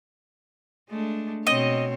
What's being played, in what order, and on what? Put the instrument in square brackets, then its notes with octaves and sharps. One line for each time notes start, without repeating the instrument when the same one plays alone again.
[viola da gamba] G#3 A3 D4
[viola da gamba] B2 C4 C#5 [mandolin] D#5